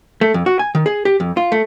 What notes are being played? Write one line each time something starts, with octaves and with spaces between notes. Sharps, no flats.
A3
F2
F#4
G#5
D#3
G#4
G4
F2
F4
A3